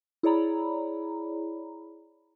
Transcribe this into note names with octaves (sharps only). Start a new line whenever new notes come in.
E4 G#4 C#5 D5 A#5 B5